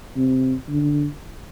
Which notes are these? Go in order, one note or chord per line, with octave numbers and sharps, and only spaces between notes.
C3
D3